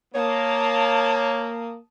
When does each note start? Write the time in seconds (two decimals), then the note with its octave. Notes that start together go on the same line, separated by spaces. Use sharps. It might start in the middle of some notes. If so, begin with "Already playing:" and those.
0.15 A#3 C#5 A5 D#6